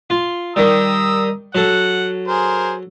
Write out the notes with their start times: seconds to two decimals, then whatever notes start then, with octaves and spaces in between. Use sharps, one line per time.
0.10 F4
0.56 D#3 G3 A#5 D#6 E6
1.55 F#3 A4 F#5
2.28 G#4 A#4 C5